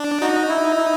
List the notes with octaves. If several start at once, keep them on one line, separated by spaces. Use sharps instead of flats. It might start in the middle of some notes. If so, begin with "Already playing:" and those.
Already playing: D4
D#4 F#4
E4
E4